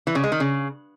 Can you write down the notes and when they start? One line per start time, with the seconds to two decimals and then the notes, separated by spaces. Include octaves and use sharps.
0.07 E3
0.15 C#3
0.23 G#3
0.32 D#3
0.40 C#3